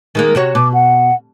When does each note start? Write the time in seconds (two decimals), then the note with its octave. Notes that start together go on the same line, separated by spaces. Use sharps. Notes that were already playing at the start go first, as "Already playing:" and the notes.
0.15 D#3 G#3 A#3
0.35 C3 F#4 C#5
0.55 B2 D6
0.74 F#5